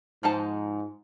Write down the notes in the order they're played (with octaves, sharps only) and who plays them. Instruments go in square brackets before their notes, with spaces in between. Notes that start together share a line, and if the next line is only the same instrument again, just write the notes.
[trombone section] G#2 [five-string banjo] F3 D#4 A5